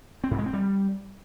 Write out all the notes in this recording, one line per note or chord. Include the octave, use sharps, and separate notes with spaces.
C4
G#2
G#3
C4
G3